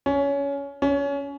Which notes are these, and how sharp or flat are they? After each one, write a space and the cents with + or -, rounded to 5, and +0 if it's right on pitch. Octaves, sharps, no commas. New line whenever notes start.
C#4 +20
C#4 +25